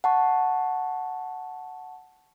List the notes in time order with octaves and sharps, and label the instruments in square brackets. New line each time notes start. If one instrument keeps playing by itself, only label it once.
[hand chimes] F#5 A5 C#6